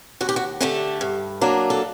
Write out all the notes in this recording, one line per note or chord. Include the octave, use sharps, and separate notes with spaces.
D#2 F#4
G4
F#4
D3 A3 D4 G4
G2
F#3 A#3 D4
A4